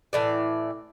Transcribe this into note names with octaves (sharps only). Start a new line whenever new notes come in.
A2 E3 D5